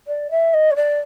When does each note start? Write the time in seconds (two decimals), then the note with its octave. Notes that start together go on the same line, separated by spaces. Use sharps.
0.07 D5
0.31 E5
0.54 D#5
0.71 C#5
0.76 D5